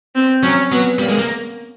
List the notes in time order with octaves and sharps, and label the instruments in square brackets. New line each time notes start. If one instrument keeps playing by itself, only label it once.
[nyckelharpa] C4
[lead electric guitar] F#3 [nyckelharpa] C#4
[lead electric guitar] F#3 [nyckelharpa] B3
[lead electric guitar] G3 [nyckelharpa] A#3
[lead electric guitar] G#3
A#3